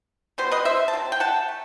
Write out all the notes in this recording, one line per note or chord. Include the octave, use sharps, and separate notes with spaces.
B2 G3 B3 C5
B4 D#5
C5 E5
A5
C3 F#3
G5
F#5 A5
A3